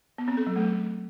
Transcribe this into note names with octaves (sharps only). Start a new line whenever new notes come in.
B3
C4
A4
F#3
A3